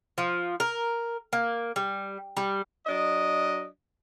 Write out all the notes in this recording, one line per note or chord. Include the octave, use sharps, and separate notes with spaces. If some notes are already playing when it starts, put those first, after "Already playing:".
F3
A#4
A#3
G3
G3
F#3 D4 D#5